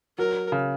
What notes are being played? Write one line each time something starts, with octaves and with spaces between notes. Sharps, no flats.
F#3 A#4
C#3